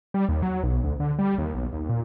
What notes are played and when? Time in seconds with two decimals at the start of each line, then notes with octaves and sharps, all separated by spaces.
0.14 G3
0.29 D#2
0.42 F#3
0.63 B1
0.84 D2
1.00 D3
1.19 G3
1.38 D#2
1.54 B1
1.73 D#2
1.89 A#2